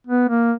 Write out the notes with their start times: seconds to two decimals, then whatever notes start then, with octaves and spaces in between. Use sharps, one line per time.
0.07 B3
0.29 A#3